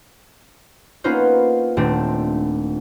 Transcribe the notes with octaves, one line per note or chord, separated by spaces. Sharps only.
A#3 B3 C#4 D#4 F4 C5
D#1 A3 C4 D4